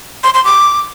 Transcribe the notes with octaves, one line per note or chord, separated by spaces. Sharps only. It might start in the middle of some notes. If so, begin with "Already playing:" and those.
C6
C6
D6